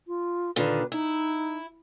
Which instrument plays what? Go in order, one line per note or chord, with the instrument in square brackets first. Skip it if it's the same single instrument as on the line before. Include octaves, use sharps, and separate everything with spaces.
[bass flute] F4
[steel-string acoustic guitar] A#2 D3 D#3 [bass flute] B4
[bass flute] D#4 [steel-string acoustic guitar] E4